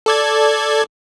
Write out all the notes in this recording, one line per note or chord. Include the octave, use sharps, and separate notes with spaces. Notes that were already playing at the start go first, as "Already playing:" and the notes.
A4 D5 G#6